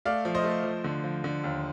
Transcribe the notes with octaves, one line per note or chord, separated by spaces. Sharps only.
A3 D5 F5
F3
C5 D#5
A3
F3
D3
F3
D3
D#2